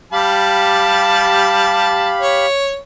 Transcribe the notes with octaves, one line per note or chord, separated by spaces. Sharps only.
G3 G4 F5 A5 B5
C#5